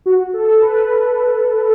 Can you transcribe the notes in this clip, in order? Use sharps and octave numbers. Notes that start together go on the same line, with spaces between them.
F#4
A4
B4